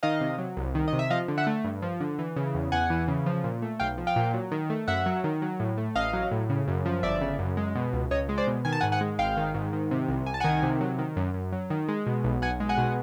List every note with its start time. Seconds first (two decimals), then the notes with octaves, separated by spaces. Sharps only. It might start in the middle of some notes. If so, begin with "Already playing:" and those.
0.03 D#3 D#5 F5
0.21 C3
0.38 F#3
0.57 C2
0.75 D#3
0.88 D#5
0.93 C3
0.99 E5
1.10 F3 D#5 F5
1.28 D3
1.38 E5 F#5
1.47 A3
1.64 G2
1.82 F3
2.00 D3
2.19 E3
2.36 C#3
2.54 E2
2.72 E2 F#5 G#5
2.90 E3
3.08 C#3
3.26 F3
3.44 A#2
3.62 A3
3.80 B1 F5 G5
3.98 F3
4.07 F5 G5
4.16 A#2
4.34 F#3
4.52 D#3
4.70 A3
4.88 F#2 E5 F#5
5.06 F#3
5.24 D#3
5.42 F#3
5.60 A2
5.78 A3
5.95 A1 D#5 F5
6.13 F#3
6.31 A2
6.49 C#3
6.68 F#2
6.86 F3
7.03 G1 D5 E5
7.21 C#3
7.39 F#2
7.57 G#3
7.75 B2
7.93 C#2
8.11 C#2 C#5 D#5
8.29 G#3
8.38 C5 D5
8.47 B2
8.65 D#3 G#5
8.73 A5
8.81 G#2 F#5 G#5
8.92 F#5 G#5
9.01 G#3
9.19 G#1 F5 G5
9.37 D#3
9.54 G#2
9.73 D#3
9.91 C3
10.09 C2
10.26 C2 G#5
10.34 A5
10.40 D#3 F#5 G#5
10.63 C3
10.81 F#3
10.99 D#3
11.16 F#2
11.34 F#2
11.52 F#3
11.70 D#3
11.89 G#3
12.06 B2
12.24 B1
12.42 B1 F#5 G#5
12.60 G#3
12.69 F#5 G#5
12.78 B2